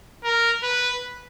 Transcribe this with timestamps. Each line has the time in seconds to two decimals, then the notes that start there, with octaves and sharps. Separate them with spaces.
0.24 A#4
0.63 B4